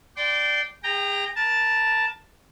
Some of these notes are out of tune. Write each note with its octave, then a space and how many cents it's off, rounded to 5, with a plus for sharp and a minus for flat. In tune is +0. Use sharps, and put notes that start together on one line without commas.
D5 +0 G5 -20 C6 -15
G#4 -40 G5 +5 A#5 -5
A#4 +30 A5 +0